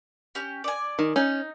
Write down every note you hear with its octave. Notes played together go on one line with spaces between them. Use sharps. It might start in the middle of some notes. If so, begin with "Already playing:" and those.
C#4 G4
D5 G#5
D#3
C#4 D#4